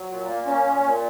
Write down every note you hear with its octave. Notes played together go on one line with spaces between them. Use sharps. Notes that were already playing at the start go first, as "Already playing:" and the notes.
Already playing: F#3
A#2
A#3
C#4
A#2
A#2